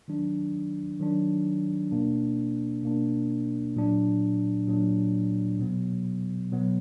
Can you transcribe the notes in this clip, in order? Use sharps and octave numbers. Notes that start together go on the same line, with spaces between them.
D#3 F#3 D4
D#3 F#3 D4
B2 A#3 D4
B2 A#3 D4
A#2 F#3 D4
A#2 F#3 D4
B2 F#3 B3
B2 F#3 B3